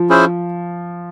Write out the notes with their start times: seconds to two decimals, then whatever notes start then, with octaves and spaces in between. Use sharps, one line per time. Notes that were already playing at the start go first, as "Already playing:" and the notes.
Already playing: F3
0.10 C#4 E4 G#4 C5